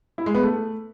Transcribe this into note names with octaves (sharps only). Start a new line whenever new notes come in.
E4
G#3
B3
A3